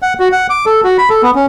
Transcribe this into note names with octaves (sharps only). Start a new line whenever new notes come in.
F#5
F#4
F#5
D6
A4
F#4
B5
A4
B3
C#4